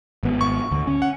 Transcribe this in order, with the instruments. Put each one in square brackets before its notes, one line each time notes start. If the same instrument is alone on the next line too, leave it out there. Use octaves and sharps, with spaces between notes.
[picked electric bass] G#1 B3
[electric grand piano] C#6
[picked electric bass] D2
C#4
[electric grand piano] F#5